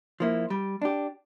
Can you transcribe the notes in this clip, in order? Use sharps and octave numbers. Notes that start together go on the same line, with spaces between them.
F3 A#3 E4
G3
D4 G4